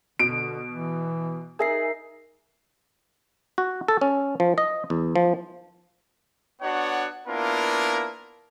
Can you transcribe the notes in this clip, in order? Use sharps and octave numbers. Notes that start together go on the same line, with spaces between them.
B2 D3 D7
E3
D#4 G#4 A#4 E5 C7
F#4
A4
C#4
F3
D#5
E2
F3
B3 D4 F#4 C#5 F#5
A#3 B3 D4 E4 F4 A#4